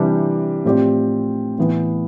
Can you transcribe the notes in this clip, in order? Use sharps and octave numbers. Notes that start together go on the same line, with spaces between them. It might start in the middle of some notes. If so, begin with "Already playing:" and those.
Already playing: C3 E3 G3 D4
A2 F3 C4 G4 D5
A2 E3 B3